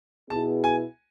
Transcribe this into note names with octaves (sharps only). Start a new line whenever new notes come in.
B2 B3 E4 G#4 A5
G#5